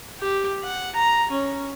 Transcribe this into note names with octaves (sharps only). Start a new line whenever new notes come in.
G4
F#5
A#5
C#4